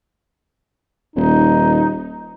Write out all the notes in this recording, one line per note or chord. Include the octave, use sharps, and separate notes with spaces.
D#1 D#4